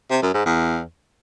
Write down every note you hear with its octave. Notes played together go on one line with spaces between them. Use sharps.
C3
F#2
G#2
E2